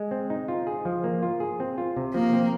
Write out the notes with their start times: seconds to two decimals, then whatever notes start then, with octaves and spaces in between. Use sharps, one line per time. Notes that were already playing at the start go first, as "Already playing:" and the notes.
Already playing: G#3
0.11 C4
0.30 D#4
0.48 F4
0.67 G#4
0.85 F3
1.04 A#3
1.23 F4
1.40 G#4
1.60 C4
1.78 F4
1.97 C3
2.14 F3 A#3
2.33 C4